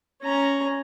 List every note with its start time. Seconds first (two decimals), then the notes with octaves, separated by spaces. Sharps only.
0.22 C#4 A#5